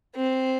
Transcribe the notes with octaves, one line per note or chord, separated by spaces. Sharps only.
C4